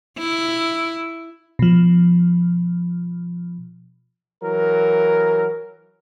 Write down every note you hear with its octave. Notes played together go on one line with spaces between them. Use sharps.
E4
B2 F3
E3 F#3 A#4